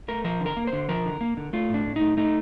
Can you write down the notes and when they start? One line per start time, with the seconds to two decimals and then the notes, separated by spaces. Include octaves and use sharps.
0.08 A3 A#4
0.24 F3 A#4
0.41 D3
0.46 A#4
0.57 A#3
0.67 C5
0.73 D3
0.89 F3 A#4
1.05 D3
1.21 A#3
1.37 D3
1.53 A3 F4
1.69 A2
1.74 D4
1.86 A2
1.96 D#4
2.01 A3
2.17 A3 D#4